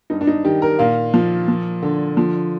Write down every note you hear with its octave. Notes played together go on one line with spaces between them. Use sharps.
G2 D#4
D4
D#4
D#3 G4
A#4
A#2 F5
F3
F3
D3
F3